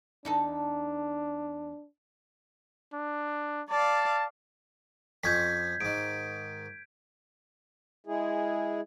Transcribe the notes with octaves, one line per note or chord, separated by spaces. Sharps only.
E2 D4 D#4 A4
D4
D5 F5 A5
F2 C4 C#4 G6 G#6 B6
G#2 D#3 D7
G#3 E4 G#4